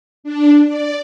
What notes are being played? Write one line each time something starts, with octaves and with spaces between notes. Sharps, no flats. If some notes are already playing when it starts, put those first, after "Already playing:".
D4
D5